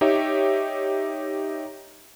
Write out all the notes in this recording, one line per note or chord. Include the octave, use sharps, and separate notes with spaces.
D#4 G4 C#5 E5